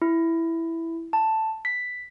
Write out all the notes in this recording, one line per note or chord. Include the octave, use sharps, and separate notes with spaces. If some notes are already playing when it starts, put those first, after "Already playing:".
E4
A5
B6